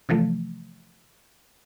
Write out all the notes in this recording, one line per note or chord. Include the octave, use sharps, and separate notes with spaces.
C3 E3 F3 A3